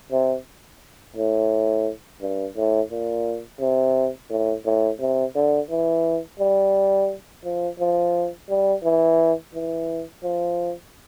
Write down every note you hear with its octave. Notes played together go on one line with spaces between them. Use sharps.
C3
A2
G2
A2
A#2
C3
A2
A2
C3
D3
E3
G3
F3
F3
G3
E3
E3
F3